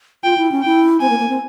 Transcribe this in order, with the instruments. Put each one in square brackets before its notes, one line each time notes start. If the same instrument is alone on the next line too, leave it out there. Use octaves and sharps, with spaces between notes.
[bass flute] F4 [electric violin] G5
[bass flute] E4
C#4
[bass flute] E4 [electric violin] G5
[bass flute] C4 [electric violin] G#5
[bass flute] A#3
A#3
C4